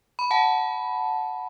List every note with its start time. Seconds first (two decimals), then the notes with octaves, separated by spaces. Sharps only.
0.19 B5
0.31 F#5 A5